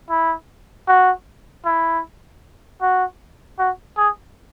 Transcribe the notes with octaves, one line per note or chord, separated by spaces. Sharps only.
E4
F#4
E4
F#4
F#4
G#4